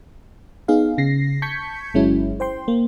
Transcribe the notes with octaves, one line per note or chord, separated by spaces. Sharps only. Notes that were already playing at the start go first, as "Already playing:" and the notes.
B3 D#4 G#4 F5
C#3 A#6 C7
A5 C#6 G6 G#6 B6 C#7
G1 F#3 G#3 C#4 E4
C5 G5 C6
A#3